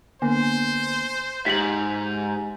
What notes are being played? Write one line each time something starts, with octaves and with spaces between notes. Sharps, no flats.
D3 A#3 B3 C5 G#5
G#2 G4 B6 F#7